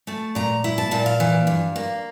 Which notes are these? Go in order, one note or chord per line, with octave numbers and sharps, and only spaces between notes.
A3 A5
A#2 A#5
E4
A5
A#2 A5
F5
E3
G2
A#3